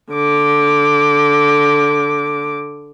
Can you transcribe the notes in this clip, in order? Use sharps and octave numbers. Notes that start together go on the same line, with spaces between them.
D3 D6